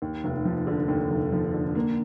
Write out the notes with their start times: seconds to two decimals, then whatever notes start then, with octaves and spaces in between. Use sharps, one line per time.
0.02 D#2
0.24 F1
0.45 F3
0.67 D3
0.88 D#2
1.11 F1
1.32 F3
1.53 D3
1.75 A#3